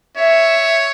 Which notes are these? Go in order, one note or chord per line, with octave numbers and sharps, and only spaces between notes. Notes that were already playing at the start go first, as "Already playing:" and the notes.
C#5 E5